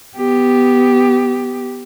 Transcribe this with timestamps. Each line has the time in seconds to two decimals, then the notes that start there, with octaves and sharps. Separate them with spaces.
0.16 B3 G4